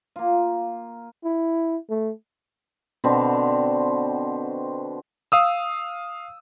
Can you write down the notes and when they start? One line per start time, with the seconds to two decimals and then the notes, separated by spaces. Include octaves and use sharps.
0.16 A#3 F4
1.24 E4
1.90 A3
3.04 B2 D3 C4
5.32 F5 D#6 E6